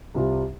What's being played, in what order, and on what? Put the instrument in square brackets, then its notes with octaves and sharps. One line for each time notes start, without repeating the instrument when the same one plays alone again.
[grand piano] C2 C3 G3 F4